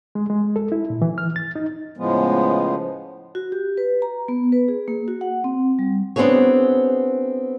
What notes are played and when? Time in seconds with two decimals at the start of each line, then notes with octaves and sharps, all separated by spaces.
0.15 G#3
0.30 G#3
0.56 A4
0.72 E4
0.90 A#2
1.02 E3
1.18 F6
1.36 A6
1.56 D#4
1.97 A2 C#3 F3 G#3 B3
3.35 F#4
3.52 G4
3.77 B4
4.02 A#5
4.28 B3
4.52 B4
4.68 G#4
4.88 A#3
5.08 F#4
5.21 F#5
5.44 C4
5.79 G3
6.16 B3 C4 D4 F#4 G#4 C#5